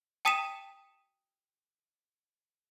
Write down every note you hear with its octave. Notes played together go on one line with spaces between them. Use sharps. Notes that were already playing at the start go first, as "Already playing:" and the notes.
G5 A5 D#6 B6 D#7 E7